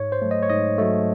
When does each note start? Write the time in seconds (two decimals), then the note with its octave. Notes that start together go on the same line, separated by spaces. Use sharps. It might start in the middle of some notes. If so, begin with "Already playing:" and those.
Already playing: G#2 C#5
0.12 C5
0.22 F#3 A3
0.31 D#5
0.42 C#5
0.49 G#2 D#5
0.78 F#3 A3